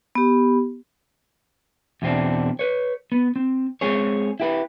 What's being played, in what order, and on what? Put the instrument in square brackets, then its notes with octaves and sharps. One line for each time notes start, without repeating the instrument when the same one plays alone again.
[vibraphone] B3 G4
[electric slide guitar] E2 B2 C4 D4
B4 C#5
B3
C4
G#3 C4 G#4 C#5
E4 G4 B4